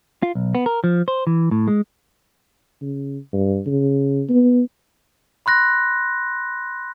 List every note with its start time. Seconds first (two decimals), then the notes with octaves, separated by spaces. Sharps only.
0.23 F4
0.35 B1
0.55 B3
0.66 A#4
0.84 F3
1.08 C5
1.27 E3
1.51 A2
1.68 G#3
2.81 C#3
3.33 G2
3.66 C#3
4.29 B3
5.46 B5 C6 F#6 A#6